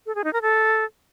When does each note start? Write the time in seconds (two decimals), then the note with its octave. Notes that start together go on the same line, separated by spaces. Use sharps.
0.06 A4
0.15 G#4
0.24 D#4
0.33 A#4
0.42 A4